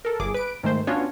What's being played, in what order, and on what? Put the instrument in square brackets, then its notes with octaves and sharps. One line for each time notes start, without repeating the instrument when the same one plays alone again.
[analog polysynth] A4 A#4
G1 G#4 D6
B4 D7
G#2 D#3 A3 C5
B3 C#4 D4 F4 F#4 C#5